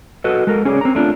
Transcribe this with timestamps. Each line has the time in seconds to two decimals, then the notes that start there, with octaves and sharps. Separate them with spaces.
0.24 F#4 A4 B4 D#5
0.47 G#3 A4 A#4
0.65 C#4 G#4 A#4 C#5 D5
0.81 C4 A#5
0.95 A3 D4 F4